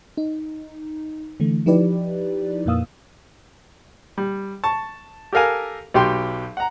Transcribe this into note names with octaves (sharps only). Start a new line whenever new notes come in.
D#4
D3 E3 A3
F3 D#4 E4 G4 B4 D5
F2 A#2 A#3 F5 D#6 E6
G3
A5 C#6
G4 A4 A#4 F5 G#5
B1 F#3 G4 G5 C6
F#5 A#5